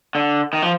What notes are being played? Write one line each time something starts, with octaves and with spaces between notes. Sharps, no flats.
D3
D#3
F3